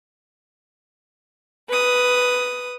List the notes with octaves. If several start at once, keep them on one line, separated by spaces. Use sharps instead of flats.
B4 D#6